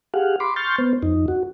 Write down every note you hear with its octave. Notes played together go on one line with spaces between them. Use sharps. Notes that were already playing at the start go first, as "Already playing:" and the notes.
G4 G#4 F5 F#5
B5 C6 D6
C6 C#6 F6 G6 A6
B3 C5
F2 D#4
F#4